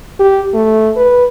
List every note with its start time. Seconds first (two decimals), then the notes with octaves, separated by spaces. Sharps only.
0.19 G4
0.54 A3
0.96 B4